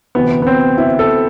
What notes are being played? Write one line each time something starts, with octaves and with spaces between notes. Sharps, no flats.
D2 C3 E3 B3
B3
C4
E4
A4